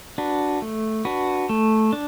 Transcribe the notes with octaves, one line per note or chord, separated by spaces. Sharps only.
D4 F#4 B4
A3
D4 F#4 B4
A3
D4